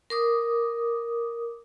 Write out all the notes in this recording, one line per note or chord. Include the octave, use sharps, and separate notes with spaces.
A#4 D6 D#6